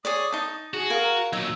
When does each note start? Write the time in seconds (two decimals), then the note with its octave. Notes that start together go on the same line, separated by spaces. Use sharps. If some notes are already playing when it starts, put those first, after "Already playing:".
0.05 G#4 C#5 D5 D#6
0.33 D#4 A5
0.74 F#4 G#4
0.90 A#4 F5 G#5
1.04 A#5
1.33 A#2 F#3 D#4 E6